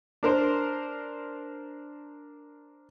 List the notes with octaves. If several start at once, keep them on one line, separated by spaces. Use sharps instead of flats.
D4 A#4 C5